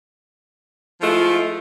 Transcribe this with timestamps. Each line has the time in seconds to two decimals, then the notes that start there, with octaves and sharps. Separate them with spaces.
1.01 F3 G#3 A3 E4 F4